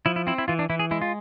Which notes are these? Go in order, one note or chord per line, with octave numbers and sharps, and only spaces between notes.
F3 E4
E4
C4 E4
E4
E3 F4
D4
E3 E4
G#4
G#3 E4
F4